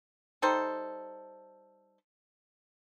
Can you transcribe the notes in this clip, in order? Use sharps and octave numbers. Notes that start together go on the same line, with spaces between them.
G3 D#4 A4 C5